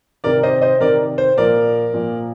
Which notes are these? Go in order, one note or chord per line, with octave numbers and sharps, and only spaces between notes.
C3 D#3 A#4 D5
C5 D#5
C5 D#5
C3 D#3 A#4 D5
C5
A#2 F3 A#4 D5
A#2 F3